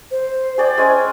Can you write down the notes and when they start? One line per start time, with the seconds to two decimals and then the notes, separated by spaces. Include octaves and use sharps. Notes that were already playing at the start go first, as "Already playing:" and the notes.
0.11 C5
0.58 G#4 D5 G5
0.77 G#3 C#4 G#5